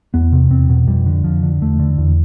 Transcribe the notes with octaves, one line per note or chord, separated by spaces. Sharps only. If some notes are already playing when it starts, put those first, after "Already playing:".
E2 B3
C3
E2 C4
B2
F2 G3
D3
F2 F3
D3
E2 A3
D3
E2